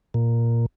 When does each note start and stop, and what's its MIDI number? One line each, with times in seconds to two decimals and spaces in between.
0.14 0.66 46